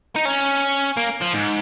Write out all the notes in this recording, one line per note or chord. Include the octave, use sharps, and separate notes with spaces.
D#4
C#4
A#3
F3
G#2